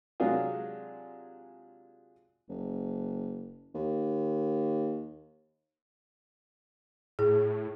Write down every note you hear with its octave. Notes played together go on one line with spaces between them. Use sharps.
C3 F#3 G#3 D4 F4 G#4
F#1
D#2
A2 G#4